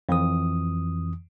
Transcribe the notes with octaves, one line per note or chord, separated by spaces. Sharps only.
F2 E3 D#6